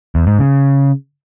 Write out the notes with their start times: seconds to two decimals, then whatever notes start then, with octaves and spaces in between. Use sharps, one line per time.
0.15 E2
0.27 G#2
0.39 C#3